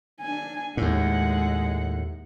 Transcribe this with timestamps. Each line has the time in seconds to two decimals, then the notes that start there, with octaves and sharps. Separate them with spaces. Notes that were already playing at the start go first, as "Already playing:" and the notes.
0.21 D4 G#5
0.77 D#2 A2 G#3 F#5